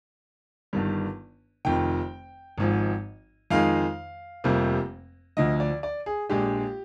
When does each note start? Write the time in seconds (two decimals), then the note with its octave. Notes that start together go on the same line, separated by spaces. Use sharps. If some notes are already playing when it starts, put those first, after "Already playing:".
0.73 G1 G2 D#3 G3
1.65 F1 F2 D#3 G5
2.58 G#1 G#2 F3
3.51 F2 D#3 G#3 D#4 F5
4.44 F1 F2 C3 G3 A#3
5.37 D2 D3 F3 D#5
5.60 D5
5.83 D5
6.06 G#4
6.29 A#1 A#2 G#3 D4 G4